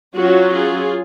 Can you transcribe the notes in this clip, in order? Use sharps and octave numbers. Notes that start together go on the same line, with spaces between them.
F#3 C#4 F4 F#4
F4 G#4